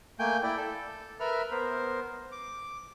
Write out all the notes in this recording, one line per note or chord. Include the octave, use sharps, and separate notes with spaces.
A3 A#3 G5 G#5 G6
E4 D5 G5
A4
A#4 B4 E5 B5 F6
B3 A#4 C5
D6